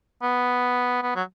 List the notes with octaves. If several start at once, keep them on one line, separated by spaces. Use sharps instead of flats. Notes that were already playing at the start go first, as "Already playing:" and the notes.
B3
B3
F#3